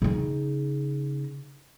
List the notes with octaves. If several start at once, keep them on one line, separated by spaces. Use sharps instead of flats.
C#3 D#4